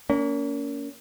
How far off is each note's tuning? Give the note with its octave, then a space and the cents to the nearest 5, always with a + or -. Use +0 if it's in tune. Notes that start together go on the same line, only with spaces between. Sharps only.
A#3 +0 C#4 +40